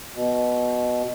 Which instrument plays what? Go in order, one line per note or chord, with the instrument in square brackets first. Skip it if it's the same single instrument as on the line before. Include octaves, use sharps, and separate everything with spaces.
[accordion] B2